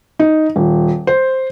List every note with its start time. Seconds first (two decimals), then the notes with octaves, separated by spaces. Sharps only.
0.19 D#4
0.56 D#1
1.07 C5